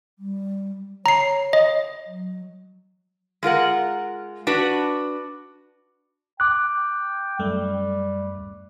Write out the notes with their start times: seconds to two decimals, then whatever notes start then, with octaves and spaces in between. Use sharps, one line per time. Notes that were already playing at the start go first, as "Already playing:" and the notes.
0.19 G3
1.06 C#5 A#5 C7
1.53 D#5
2.06 F#3
3.43 G#3 F4 A#4 F#5
4.47 D4 F#4 B4
6.40 G5 D6 F#6
7.39 F#2 G3 A3